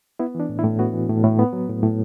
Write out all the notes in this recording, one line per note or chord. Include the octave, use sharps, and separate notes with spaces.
B3 E4
E3 D4
A2
E4
A2
B3 F#4
E3
A2
A2
B3
F#3
A2
A2